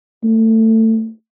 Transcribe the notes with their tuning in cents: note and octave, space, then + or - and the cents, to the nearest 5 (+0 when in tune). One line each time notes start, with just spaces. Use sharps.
A3 +25